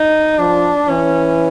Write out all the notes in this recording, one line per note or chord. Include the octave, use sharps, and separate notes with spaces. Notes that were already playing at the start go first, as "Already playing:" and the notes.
Already playing: D#4
F3 D4
E3 C#4